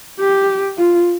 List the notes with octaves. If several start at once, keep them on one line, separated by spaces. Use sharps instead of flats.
G4
F4